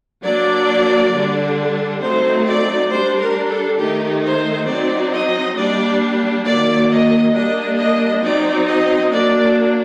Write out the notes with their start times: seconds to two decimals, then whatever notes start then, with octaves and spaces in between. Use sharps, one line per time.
0.24 F#3 A#3 D4 D5
1.12 D3 G3 D4
2.01 F#3 A3 C4 D#4 C5
2.46 D5
2.90 G3 D4 C5
3.19 A#4
3.49 A4
3.79 D#3 A3 D#4 G4
4.23 C5
4.67 F#3 C4 D#4 D5
5.11 D#5
5.56 G3 A#3 D4 D5
6.45 D#3 F#3 A#3 D5
6.89 D#5
7.34 G3 A#3 D4 D#5
7.78 D#5
8.22 F#3 C4 D#4 D5
8.66 D#5
9.12 F#3 A#3 D4 D5